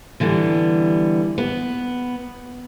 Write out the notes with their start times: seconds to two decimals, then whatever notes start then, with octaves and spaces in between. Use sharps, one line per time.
0.20 D3 E3 G3 B3
1.38 B3